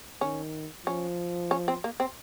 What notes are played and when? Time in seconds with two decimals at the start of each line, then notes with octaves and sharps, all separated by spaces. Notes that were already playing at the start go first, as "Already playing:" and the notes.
0.21 D#3 C#4
0.87 F3 C#4
1.51 C#4
1.68 C4
1.84 A#3
2.00 C4